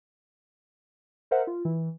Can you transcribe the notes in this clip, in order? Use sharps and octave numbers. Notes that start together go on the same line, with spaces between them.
A#4 C5 E5 F#5
F4
E3